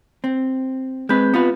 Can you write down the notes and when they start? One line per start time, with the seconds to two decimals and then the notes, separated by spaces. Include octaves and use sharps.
0.24 C4
1.09 G#3 C4 B4 G6
1.34 B3 F4 B4